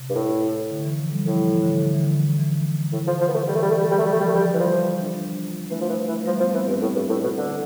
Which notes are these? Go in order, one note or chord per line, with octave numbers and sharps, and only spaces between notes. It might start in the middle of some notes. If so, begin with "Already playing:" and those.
Already playing: C3
G2
A2
D3
E3
F3
G3
A2 F3
E3
D3
D3
E3
D3
E3
A2 D3
F3
F3
B3
A3
E3 G3
A3
G3
A3
G3
A3
G3
A3
F3 G3
A3
G3
A3
G3
E3
F3 G3
F4
D4
D4
E3 A3
F3
E3
E3
F3 G3
F3 B3
E3 C4
G2 B3
A2 B3
G2
A2
B2
D3